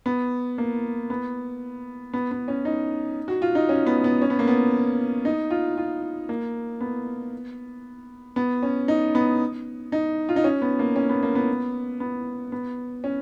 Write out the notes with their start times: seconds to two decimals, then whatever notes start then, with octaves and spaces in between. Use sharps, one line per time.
0.06 B3
0.58 A#3
1.10 B3
2.13 B3
2.31 B3
2.48 C#4
2.65 D#4
3.28 F#4
3.42 F4
3.55 D#4
3.69 C#4
3.87 B3
4.04 B3
4.22 C#4
4.30 B3
4.39 A#3
4.47 B3
5.25 D#4
5.50 F4
5.77 F4
6.29 A#3
6.81 B3
8.36 B3
8.63 C#4
8.88 D#4
9.15 B3
9.92 D#4
10.29 F4
10.36 D#4
10.44 C#4
10.62 B3
10.79 A#3
10.96 C#4
11.09 B3
11.23 A#3
11.35 B3
12.00 B3
12.52 B3
13.04 C#4